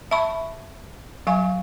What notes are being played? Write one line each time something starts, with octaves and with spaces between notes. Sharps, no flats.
E5 A5 B5 C#6
F#3 F5 G#5 C#6